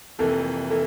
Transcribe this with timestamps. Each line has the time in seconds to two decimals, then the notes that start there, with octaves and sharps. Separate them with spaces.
0.19 F1 F2 E3 A#3 A4
0.70 E3 A#3 A4